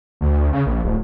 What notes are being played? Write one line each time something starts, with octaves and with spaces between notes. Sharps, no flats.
D2
C#3
A#1
D1